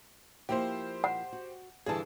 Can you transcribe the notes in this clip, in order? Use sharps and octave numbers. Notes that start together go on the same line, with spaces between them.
F3 A#3 E4 G4 C5
F#5
F#4
G2 D3 E3 G#4 A5